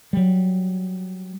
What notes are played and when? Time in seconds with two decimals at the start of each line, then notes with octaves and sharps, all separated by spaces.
0.13 F#3 G3